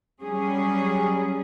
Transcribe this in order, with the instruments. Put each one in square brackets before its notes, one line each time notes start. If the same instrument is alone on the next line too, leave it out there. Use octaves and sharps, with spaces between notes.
[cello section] F#3 G3 C#4 G#4